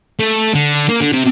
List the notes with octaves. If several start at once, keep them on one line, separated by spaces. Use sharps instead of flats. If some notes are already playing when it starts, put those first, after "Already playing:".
A3
D3
A#3
D3
C3